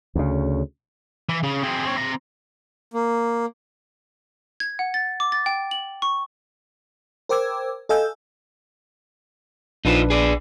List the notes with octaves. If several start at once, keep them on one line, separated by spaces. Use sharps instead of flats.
D2 C#3
E3
C#3
C4 G#4
C4 C#5
C4 A#5
A#3
G#6
F#5
A6
D6
A6
G5
F#7
C#6
A#4 C5 G5 D6 E6 G#6
A4 D#5 F5 G#5 E6 G6
A#1 D4 D#4 F4 B4 C5
G#4 D5